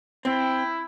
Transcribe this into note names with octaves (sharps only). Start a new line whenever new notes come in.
C4 E4 G5